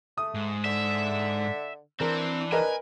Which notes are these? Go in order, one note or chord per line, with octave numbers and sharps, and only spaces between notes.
A3 D#6
G#2
D3 E5
E3 C4 D4 A#4
A#4 B4 D#5 G#5